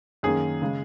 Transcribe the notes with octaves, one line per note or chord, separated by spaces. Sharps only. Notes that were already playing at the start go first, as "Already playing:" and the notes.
F#2 D#3 A#3 G#4
C#3 G#3